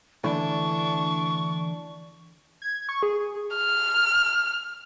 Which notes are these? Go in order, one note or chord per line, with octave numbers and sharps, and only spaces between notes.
D3 E3 A3 D4 C#6
G#6
C#6
G#4
F6